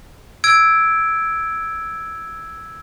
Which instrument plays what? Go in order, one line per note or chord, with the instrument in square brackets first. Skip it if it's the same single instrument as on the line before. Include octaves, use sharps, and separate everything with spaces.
[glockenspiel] E6 G#6 D7